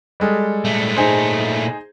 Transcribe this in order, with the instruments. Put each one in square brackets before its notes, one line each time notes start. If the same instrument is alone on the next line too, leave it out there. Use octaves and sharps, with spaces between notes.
[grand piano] G3 G#3 A4
[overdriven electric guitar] A#2 A3
[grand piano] D#4 G#4 C5